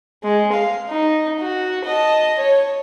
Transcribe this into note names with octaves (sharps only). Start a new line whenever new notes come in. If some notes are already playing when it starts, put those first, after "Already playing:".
G#3
F5
D#4
F#4
D#5 A5
C#5